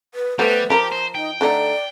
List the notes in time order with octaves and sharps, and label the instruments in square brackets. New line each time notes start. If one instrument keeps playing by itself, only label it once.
[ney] B4
[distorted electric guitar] G3 [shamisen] A3 B3 C5 [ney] B4
[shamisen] F3 A#4 [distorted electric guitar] G4 [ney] A#5
[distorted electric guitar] C5
[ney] D#4 [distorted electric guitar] G5
[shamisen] D3 A3 D#4 [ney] D5